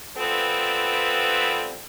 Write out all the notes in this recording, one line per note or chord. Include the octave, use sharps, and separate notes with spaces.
G3 B3 C4 F4 A4 B4